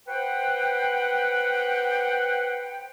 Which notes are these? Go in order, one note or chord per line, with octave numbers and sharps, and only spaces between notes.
B4 C5 F#5 G5